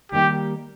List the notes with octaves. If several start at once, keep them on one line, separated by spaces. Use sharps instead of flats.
D#3 G3 A#3 D#4 G4